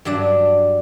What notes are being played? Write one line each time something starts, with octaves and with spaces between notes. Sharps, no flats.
G2 F#3 D4 D5